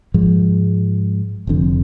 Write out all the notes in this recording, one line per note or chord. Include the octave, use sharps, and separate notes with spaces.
G#2 F3 G#3
F1 F2 D3